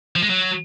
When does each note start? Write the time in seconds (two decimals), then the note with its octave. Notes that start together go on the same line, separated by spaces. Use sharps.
0.16 F3
0.22 G#3
0.29 F#3